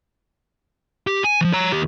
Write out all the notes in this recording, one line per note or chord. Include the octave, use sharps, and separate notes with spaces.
G4
G#5
E3 F3
C#5 A#5
D#2 G4